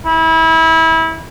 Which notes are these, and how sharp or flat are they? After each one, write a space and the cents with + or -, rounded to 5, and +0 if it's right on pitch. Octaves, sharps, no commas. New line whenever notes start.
E4 -25